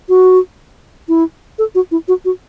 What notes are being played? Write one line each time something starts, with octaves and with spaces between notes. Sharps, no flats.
F#4
E4
A4
F#4
E4
F#4
F#4